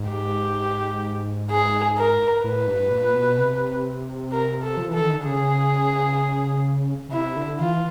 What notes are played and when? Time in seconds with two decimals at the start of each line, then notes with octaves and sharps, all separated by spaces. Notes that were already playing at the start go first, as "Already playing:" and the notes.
Already playing: G#2
0.10 G4
1.51 G#4
1.98 A#4
2.44 A2 B4
2.67 G2
2.91 A#2
3.15 B2
3.38 C3
4.32 A#4
4.63 A4
4.77 F3
4.89 E3 A4
5.01 D#3
5.14 D3
5.25 C#3 G#4
7.09 C#3
7.12 C3 E4
7.37 D3
7.60 E3 F4